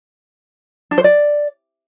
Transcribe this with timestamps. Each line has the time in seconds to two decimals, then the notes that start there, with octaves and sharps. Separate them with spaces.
0.91 D4
0.98 C5
1.04 D5